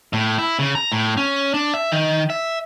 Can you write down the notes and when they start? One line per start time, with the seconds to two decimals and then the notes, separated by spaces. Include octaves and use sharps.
0.13 A2
0.38 E4
0.59 C#3
0.75 A#5
0.92 A2
1.17 C#4
1.54 D4
1.74 E5
1.92 D#3
2.30 E5